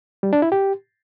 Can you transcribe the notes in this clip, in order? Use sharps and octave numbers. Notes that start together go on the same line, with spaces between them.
G3
D4
E4
G4